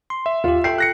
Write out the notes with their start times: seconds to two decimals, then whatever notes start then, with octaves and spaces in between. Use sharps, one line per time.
0.10 C6
0.26 E5
0.44 D#2 F4 G4
0.64 A4 G5 C7
0.78 F#6 A#6 C#7